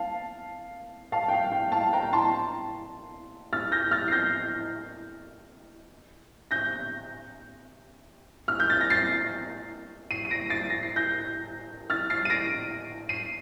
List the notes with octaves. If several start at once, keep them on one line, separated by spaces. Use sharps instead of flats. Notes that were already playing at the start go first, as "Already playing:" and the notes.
Already playing: F5 A5
F5 A5
G5
F5
G5
F5 A5
G5 A#5
A5 C6
F6 A6
G6 A#6
F6 A6
C7
G6 A#6
G6 A#6
F6
G6
A6
A#6
A6 C7
C7 D#7
D#7
A#6 D7
A6 C7
A#6
C7
G6 A#6
F6 A6
A6 C7
D#7
A#6 D7
C7 D#7